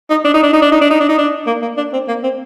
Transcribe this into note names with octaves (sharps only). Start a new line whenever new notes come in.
D#4
D4
D#4
D4
D#4
D4
D#4
D4
D#4
D4
D#4
D4
A#3
A#3
D4
C4
A#3
C4